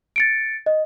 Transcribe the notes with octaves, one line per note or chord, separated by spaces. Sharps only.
A6 C#7 D7
D#5